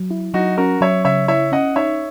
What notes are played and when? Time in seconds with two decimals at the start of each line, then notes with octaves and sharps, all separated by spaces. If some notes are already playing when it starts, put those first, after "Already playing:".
Already playing: F#3
0.11 E4
0.34 F#3 D#4 F#4
0.58 C#4 F#4 A#4
0.81 F#3 C#5 E5
1.05 C#3 C#5 E5
1.28 E4 C#5 E5
1.52 C#4 D#5 F#5
1.76 D#4 C#5 E5